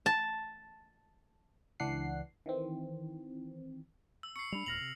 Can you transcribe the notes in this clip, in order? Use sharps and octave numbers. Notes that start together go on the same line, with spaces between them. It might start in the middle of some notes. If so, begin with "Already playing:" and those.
A5
C#2 E3 D4 F#5 C7
D#3 E3 C4
E6
C#6 C7 C#7
G3 D4 B5 F7
E1 D#2 A#2 F6 A#6 F7 F#7
C3